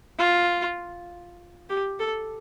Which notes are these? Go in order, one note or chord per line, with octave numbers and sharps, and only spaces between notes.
F4
G4
A4